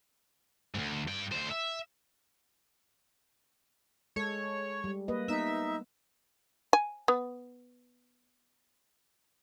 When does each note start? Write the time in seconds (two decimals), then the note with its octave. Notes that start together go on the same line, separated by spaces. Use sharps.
0.75 D2 G#2
1.08 G2 G5
1.32 D2 C5
1.50 E5
4.16 G#3 A4 C#5
4.84 G3
5.08 A#3 B4 D#5
5.28 B3 D#4 E5
6.73 G#5
7.08 B3